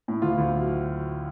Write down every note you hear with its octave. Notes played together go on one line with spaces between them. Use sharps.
A2
D2 F4
D2
F#3